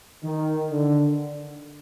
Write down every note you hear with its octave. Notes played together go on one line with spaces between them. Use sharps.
D#3
D3